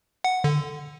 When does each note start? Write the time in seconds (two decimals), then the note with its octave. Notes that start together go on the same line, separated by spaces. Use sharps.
0.24 F#5
0.44 D3